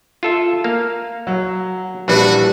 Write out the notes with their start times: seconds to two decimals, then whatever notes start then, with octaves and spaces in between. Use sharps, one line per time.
0.23 F4 A4 E5
0.64 A#3 F5
1.27 F#3
2.08 A#1 E3 G3 D4 F#4 B4